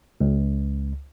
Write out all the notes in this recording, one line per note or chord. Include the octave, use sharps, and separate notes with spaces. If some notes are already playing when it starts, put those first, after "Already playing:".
C#2